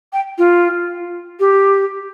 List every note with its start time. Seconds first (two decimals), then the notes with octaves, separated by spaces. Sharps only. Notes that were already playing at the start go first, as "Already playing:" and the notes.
0.13 G5
0.38 F4
1.40 G4